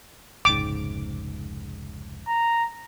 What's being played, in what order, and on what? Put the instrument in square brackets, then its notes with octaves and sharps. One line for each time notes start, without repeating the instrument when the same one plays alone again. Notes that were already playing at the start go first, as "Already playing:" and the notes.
[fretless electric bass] F1 C#2 G#2 [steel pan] D6
[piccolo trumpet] A#5